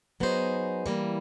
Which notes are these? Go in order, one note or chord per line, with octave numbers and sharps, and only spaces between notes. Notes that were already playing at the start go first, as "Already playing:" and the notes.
F#3 B3 D#4 G#4 C5
E3 G3 A#3